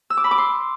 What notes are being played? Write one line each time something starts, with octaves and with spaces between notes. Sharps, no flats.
E6
D6
B5
D6
C6